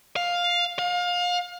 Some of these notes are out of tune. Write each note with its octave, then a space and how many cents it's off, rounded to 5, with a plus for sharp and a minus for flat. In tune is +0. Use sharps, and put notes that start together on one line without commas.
F5 +10
F5 +30